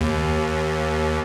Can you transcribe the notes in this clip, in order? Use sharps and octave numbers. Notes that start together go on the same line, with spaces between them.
D#2